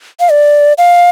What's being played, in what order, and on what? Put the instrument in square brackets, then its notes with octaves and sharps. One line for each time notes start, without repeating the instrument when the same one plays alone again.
[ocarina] F5
D5
F5